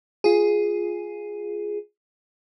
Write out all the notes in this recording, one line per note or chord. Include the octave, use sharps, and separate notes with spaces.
F4 G#4